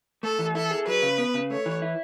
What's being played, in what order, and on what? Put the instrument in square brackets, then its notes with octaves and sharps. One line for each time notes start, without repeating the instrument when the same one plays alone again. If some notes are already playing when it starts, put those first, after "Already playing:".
[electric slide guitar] A3 [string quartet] A4
[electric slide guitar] E3
[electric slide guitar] E4 [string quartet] A4
[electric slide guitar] G#4
[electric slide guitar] F#3 [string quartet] B4
[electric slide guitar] C#3
B3
C#3
[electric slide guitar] A3 [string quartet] C#5
[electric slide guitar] E3
E4